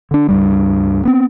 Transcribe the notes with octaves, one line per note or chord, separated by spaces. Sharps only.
D3 D4
C#2 G2 G3
B3 C4